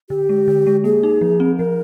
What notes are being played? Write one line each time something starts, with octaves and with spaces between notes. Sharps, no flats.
D3 G4
G#3
D3
G#3
A#3 G#4
D#4
F3
C4
F3 A#4